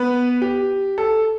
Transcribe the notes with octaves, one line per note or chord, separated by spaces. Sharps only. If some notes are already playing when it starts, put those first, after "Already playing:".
Already playing: B3 B4
G4
A4